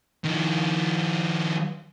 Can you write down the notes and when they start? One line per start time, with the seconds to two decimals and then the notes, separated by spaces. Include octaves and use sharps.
0.25 D#3 F3